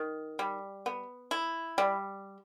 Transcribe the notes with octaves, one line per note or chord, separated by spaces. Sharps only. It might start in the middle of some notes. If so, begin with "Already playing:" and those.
Already playing: D#3
G3
B3
E4
G3